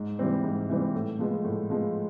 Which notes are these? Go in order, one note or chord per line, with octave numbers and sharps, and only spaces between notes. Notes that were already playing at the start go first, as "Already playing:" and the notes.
Already playing: G#2
E3 G3 C4
G#2
E3 G3 C4
A2
F3 G#3 B3
A2
F3 G#3 B3